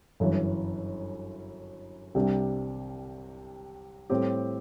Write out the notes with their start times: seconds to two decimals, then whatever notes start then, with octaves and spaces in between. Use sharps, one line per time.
0.20 G1 F#2 E3
2.15 C2 C3 G3 D4
4.10 A2 G3 C4 G4